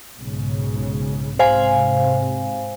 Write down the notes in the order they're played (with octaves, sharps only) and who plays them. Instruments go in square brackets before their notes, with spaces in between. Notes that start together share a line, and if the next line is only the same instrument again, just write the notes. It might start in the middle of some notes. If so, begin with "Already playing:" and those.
[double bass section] B1 G#2 C#3
[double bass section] G#2 C3 [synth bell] C5 F5 G#5